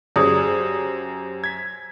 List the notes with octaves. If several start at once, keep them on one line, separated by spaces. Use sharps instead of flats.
F#2 G4 G#4 C5 D5 D#6
G#6 B6